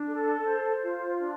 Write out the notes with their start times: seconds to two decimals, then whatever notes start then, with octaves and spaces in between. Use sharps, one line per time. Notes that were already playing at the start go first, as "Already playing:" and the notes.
Already playing: D4
0.08 A4
0.45 C5
0.83 F4
1.20 D4